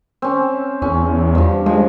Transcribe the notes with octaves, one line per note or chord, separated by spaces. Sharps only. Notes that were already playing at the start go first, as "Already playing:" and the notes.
C4 C#4
E2 C#4
G2 F3
F3 G#3